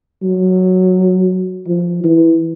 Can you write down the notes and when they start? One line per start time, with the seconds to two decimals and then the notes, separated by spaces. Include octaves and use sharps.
0.23 F#3
1.67 F3
2.04 E3